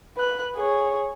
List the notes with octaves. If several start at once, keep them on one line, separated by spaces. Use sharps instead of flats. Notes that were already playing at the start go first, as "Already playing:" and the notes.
B4 F#6
G#4 C#5